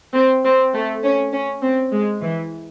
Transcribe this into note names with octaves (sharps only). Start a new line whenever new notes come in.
C4
C4
A3
C#4
C#4
C4
G#3
E3